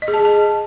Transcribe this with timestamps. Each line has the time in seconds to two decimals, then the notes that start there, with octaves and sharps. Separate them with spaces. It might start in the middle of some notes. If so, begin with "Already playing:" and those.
0.02 D#5
0.08 G#4
0.14 A5
0.19 G#4
0.25 A5